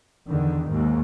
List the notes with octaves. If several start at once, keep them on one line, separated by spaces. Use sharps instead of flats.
E2 D3 D#3
D#2 G#2